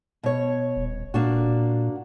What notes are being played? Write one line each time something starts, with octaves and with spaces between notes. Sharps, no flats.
B2 C#5
D#1
A#2 A#3 D4 F#4